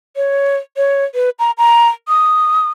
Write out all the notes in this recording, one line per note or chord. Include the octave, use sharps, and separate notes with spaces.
C#5
C#5
B4
A#5
A#5
D#6